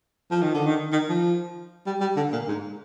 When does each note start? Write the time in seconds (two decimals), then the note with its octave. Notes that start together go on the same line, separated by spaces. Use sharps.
0.31 F3
0.42 D#3
0.54 D3
0.66 D#3
0.92 D#3
1.09 F3
1.86 G3
2.01 G3
2.16 D3
2.32 A#2
2.48 G#2